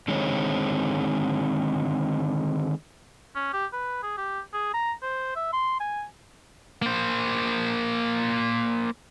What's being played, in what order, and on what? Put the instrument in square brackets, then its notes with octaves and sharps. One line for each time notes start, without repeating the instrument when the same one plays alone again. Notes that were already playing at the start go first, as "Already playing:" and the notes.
[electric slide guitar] D3 D#3 G#3 C4 D#4 C#5
[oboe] C#4
G4
B4
G#4
G4
G#4
A#5
C5
E5
C6
G#5
[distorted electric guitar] A#3 C5